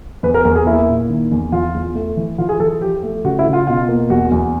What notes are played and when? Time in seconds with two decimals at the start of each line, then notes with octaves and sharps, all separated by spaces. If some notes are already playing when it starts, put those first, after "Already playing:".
0.23 E2 B4
0.34 A#4
0.45 E2 A#4
0.55 G#4
0.66 A#3 E4
0.89 A#2
1.09 D#3
1.32 E2
1.52 E3 F4
1.75 E2
1.95 A3
2.17 E3
2.38 E3 F4
2.49 G#4
2.60 E3 A4
2.81 F3 G4
3.03 A3
3.24 C#3 F#4
3.39 E4
3.46 C#3
3.53 F4
3.67 B2 F4
3.89 A#3
4.10 E2 F#4
4.32 E2